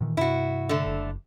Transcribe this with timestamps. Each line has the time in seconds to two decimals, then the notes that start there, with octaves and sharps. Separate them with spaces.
0.01 A#2 D#3 E3
0.17 G2 C3 E4 F#4
0.69 D3 A3
0.86 F#1